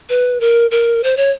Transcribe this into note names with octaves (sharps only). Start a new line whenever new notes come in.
B4
A#4
A#4
C5
C#5